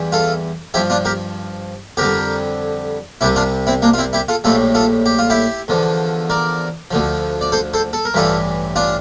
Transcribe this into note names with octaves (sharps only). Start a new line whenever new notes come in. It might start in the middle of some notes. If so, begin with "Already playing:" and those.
Already playing: E2 E3 G3
F4 A4
G2 F3 E4 G4
D4 F4
G4 A#4
F2 D3 G3 G4 A#4
C2 C3 G3 E4 G4
D4 F4
C4 E4
A#3 D4
F4
C4 E4
E4 G4
F4 A4
A#1 A2 G3 F4 A4
F4 A4
G4
F4
E4 G4
E2 D3 F3
A#4 D5
D2 D3 F3
D5
A4 C5
A4 C5
A4
A#4
A1 G2 E3 G3 F4 A4
D4 F4